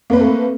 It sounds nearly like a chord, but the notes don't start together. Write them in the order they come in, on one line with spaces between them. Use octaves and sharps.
A#3 B4 C4 A4 A3